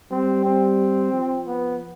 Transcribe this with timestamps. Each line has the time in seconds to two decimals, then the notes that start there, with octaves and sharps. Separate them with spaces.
0.11 G3 C4
0.45 C4
1.13 F3
1.47 B3